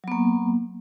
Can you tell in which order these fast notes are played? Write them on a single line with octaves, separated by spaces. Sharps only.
F#3 B3 A#3